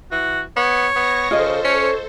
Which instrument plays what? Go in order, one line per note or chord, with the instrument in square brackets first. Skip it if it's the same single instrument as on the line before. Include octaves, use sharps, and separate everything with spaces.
[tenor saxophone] E3 [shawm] F#4
[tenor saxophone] B3 [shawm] C#5
[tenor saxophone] B3 [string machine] C#6 A#6
[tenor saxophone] C#3 [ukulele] F4 D#5 [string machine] A4 C5
[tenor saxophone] C#4 [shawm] C#5